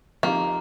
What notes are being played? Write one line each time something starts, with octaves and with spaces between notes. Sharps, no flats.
F3 A#3 C4 D#4 G4